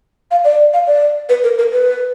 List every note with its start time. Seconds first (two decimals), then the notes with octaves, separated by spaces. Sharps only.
0.31 F5
0.45 D5
0.73 F5
0.87 D5
1.29 B4
1.44 A#4
1.58 A#4
1.72 B4